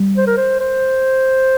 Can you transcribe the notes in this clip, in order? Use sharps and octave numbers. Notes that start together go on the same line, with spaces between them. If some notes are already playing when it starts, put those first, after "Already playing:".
Already playing: G3
C5
A#4
C5
C5